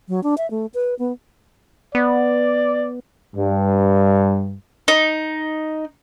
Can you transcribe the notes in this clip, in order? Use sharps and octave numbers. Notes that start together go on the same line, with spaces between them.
F#3
D4
E5
A3
B4
B3
B3 D5
G2
D#4